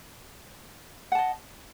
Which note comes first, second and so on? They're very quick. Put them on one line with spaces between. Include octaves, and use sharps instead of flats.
F#5 A5 D#5